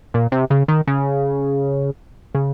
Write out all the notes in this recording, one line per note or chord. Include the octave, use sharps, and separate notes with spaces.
A#2
C3
C#3
D#3
C#3
C#3